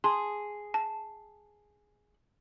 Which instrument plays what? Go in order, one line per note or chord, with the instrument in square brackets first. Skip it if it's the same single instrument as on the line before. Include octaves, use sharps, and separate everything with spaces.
[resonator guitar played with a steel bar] G#4 [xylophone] A5 C6
[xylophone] A5